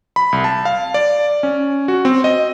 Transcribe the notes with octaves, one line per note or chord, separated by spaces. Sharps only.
B5
C2
A5
F5
D5
C#4
F#4
C4
D#5